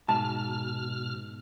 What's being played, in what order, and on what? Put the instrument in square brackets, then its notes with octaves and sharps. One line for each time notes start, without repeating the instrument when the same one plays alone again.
[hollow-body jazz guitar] G#2 A5 [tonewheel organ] B2 F6